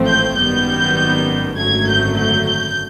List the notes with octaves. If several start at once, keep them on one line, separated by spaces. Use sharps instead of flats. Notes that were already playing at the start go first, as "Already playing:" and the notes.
Already playing: A1 G#2 F3 A3 C4
G6
G#1 F#2 D#3 G3 B3 G6
G#1 F#2 D3 F#3 A3 G#6
G6
G6
G6